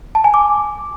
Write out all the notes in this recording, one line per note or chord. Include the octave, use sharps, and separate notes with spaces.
A5
G#5
D6